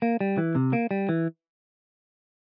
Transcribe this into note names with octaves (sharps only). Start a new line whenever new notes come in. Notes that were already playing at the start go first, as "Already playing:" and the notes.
A#3
G3
E3
C3
A#3
G3
E3